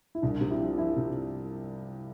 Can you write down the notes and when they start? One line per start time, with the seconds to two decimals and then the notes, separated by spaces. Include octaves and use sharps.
0.15 E4
0.22 C2 D4
0.41 C3
0.50 E4
0.60 F3
0.78 F3 E4
0.96 C3